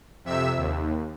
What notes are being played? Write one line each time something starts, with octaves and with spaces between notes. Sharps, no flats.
F2 C3 E5 E6
D#2